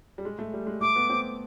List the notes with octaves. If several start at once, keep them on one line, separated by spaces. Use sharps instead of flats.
G3
G#3
A3
G3
G#3
A3 D6
B3
C4